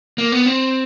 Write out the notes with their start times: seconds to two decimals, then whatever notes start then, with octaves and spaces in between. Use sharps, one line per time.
0.18 A#3
0.32 B3
0.46 C4